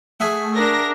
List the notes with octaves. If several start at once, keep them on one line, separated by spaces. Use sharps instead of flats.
A3 G#4 E5 F#5
D4 A#4 A#6